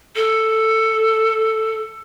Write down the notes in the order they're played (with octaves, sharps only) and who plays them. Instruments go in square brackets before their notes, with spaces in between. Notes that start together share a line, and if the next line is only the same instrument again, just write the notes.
[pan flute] A4